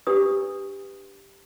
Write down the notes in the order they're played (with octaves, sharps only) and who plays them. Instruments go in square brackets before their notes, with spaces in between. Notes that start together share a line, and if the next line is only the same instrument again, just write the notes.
[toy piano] D4 G4 B4 D#6